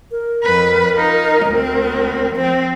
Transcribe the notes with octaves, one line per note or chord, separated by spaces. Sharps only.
A#4
F2 B4
D#4 F4
D2 C4
F3 C4 C5